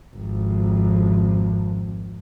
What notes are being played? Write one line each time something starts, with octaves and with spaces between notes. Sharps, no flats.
G#1 F2